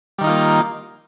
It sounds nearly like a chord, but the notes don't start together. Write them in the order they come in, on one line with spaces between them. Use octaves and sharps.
G3 D#3 D#4 F4 A#3